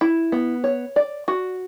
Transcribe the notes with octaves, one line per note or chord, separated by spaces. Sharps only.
E4
B3
C#5
D5
F#4